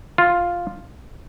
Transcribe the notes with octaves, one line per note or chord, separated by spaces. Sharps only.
F4